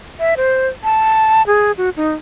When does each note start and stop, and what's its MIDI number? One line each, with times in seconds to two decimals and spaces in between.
0.20 0.34 76
0.37 0.68 72
0.84 1.42 81
1.47 1.72 68
1.78 1.90 66
1.97 2.13 63